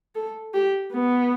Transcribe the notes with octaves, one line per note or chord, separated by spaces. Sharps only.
A4
G4
B3